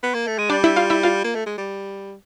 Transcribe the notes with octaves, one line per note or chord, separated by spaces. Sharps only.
B3
A#3
A3
G#3
G3 D4 D5
E4 E5
F4 F5
E4 E5
F4 F5
A#3
A3
G#3
G3